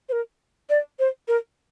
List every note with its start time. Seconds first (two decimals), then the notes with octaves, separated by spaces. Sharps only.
0.09 C5
0.12 A#4
0.70 D5
0.99 C5
1.28 A#4